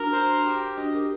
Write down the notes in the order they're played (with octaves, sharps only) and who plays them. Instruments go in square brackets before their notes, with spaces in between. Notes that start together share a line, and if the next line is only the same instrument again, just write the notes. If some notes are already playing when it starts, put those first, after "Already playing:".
Already playing: [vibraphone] D4 F#4 [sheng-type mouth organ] A#4
[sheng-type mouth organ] C5
G4
[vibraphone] D4 F#4 [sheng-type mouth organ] D#5
[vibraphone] G4 A#4